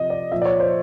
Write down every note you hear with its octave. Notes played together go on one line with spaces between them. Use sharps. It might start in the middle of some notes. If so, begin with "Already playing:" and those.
Already playing: C3 F3 D#5
D5
A#2 F3 E5
D5
C#5
C5